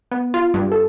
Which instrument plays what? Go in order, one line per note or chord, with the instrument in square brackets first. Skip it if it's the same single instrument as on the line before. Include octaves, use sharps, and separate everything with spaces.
[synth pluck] B3
F4
G2
A4